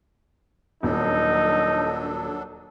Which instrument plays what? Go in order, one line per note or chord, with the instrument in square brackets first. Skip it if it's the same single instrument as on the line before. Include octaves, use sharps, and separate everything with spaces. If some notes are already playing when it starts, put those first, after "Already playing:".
[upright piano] D#1 [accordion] F#3 D4 A4 [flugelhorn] D#4